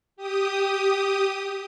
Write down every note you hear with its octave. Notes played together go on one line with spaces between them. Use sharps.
G4 D#6